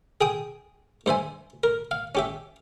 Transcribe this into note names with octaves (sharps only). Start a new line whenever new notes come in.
G#4 G5 D#6
G2 C5 E5 G#5
A#4
F5
C#4 G4 E5